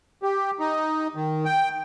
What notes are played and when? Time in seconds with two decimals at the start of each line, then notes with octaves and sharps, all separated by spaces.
0.23 G4
0.60 D#4
1.16 D#3
1.45 G5